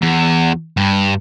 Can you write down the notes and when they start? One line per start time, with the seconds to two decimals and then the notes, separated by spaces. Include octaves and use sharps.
0.02 E2
0.77 G2